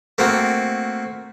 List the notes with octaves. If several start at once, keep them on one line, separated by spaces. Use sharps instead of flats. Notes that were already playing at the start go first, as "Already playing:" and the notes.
A3 A#3 C4 F#4